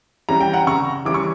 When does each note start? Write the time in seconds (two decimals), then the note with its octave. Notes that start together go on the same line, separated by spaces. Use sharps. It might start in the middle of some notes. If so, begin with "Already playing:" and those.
0.29 E3 G3 C#4 A#5
0.40 G5
0.53 F#5 A#5
0.67 C#3 A#5 C#6
1.05 E3 G3 C#4 D6
1.14 C#6